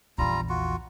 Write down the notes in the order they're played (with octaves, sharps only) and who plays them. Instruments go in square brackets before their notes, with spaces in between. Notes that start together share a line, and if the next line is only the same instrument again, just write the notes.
[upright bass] A#1 E2 [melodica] G3 F4 A#5
[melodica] F4 F#4